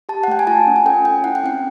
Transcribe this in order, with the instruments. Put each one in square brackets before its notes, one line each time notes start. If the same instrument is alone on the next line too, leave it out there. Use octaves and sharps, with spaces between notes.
[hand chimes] G4 A5
F#5
A3 G5
G#5
F4 A5
C#4
G#5
A4 G5
C#4 G5
E4 F#5
G5
C4 F#5